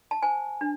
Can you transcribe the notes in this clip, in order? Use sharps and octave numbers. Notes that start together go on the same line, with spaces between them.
A5
C5 G#5
D4